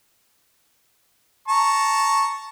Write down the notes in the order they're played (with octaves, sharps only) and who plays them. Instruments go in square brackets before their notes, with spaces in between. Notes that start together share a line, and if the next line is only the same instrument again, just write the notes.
[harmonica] A5 A#5 C#6